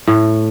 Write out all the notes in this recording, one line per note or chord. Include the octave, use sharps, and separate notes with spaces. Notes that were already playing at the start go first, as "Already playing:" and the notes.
A2